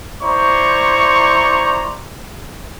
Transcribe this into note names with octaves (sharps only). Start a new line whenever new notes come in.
E4 C5 D5 A#5 C6 C#6